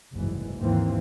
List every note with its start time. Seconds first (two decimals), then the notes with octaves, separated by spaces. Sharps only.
0.13 F#1 C2 G#2 E3
0.59 D#2 G#2 E3 A#3 C4